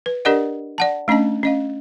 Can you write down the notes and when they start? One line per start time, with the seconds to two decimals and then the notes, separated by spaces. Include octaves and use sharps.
0.06 B4
0.25 D4 G4 A#4 D5 D#5 F#5
0.78 D5 F#5 A5
1.08 A3 C#4 D4 D#5 A5
1.43 C#4 D#5 F5